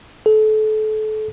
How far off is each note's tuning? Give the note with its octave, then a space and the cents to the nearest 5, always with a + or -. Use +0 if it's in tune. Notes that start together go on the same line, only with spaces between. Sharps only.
A4 -30